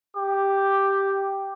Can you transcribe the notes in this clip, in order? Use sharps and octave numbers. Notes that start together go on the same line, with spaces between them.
G4 D6